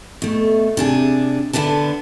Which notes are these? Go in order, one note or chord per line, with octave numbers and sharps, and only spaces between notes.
B2 A3
C3 D4 G#4
D3 B3 D4 B4 A5